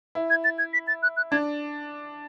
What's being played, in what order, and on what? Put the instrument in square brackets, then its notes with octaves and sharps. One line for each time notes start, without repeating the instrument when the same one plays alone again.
[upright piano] E4
[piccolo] G#6
A6
G#6
B6
A6
F#6
F#6
[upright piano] D4 [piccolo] G#6